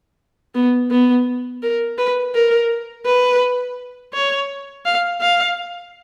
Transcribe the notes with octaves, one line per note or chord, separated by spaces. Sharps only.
B3
B3
A#4
B4
A#4
B4
C#5
F5
F5